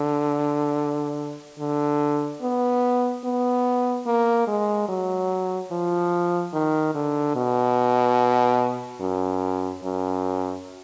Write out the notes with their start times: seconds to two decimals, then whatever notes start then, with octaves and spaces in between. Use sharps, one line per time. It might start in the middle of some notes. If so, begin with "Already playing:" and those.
Already playing: D3
1.59 D3
2.42 B3
3.24 B3
4.07 A#3
4.48 G#3
4.89 F#3
5.71 F3
6.53 D#3
6.95 D3
7.36 B2
9.01 F#2
9.83 F#2